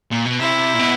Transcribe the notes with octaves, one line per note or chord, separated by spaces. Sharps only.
A#2
B2
C3 E4
A#2
B2